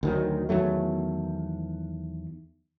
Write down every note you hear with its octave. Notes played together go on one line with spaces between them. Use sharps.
D2 D#3 F#3
E2 D#3 F#3 A3